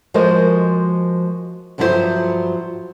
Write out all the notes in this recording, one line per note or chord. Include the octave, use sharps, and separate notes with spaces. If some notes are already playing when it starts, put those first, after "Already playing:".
F3 G#3 F#4 A#4 C5 D#5
G2 F3 F#3 E4 G4 C5